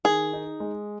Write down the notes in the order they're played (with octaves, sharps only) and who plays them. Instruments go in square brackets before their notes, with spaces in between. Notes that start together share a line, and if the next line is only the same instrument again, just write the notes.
[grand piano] D#3 [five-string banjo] G#4
[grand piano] D#4
G#3